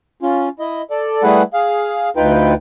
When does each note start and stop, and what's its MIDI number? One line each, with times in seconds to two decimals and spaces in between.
0.22 0.49 61
0.22 0.49 65
0.60 0.82 64
0.60 0.82 75
0.91 1.23 69
0.91 1.23 74
1.23 1.42 55
1.23 1.42 57
1.23 1.42 64
1.23 1.42 68
1.23 1.42 71
1.23 1.42 78
1.54 2.10 68
1.54 2.10 77
2.16 2.54 38
2.16 2.54 63
2.16 2.54 65
2.16 2.54 71
2.16 2.54 79